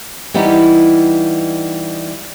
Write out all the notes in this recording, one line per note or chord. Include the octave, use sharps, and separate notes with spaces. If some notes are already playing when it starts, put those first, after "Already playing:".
E3 G3 B3 D#4